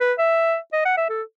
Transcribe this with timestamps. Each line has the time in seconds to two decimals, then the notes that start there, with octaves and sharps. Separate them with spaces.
0.01 B4
0.18 E5
0.73 D#5
0.85 F#5
0.97 E5
1.09 A4